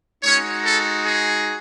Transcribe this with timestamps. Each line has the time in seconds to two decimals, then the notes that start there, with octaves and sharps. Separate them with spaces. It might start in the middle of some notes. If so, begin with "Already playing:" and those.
0.23 G#3 C#4 D#4 F#4 C#5
0.64 A4
1.04 G#4